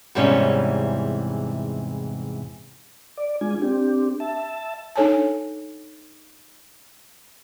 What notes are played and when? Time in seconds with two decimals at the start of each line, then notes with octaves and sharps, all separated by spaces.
0.15 E2 G#2 C3 E3 G3 C#4
3.17 D5
3.41 G#3 D4 F4 G#5
3.62 C4 D4 G4
4.20 E5 A5
4.96 D4 D#4 A4 C#5 G#5 A5